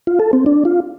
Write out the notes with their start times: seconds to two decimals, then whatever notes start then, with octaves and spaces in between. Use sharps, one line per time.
0.07 F4
0.20 A4
0.33 C4
0.46 D4
0.65 F4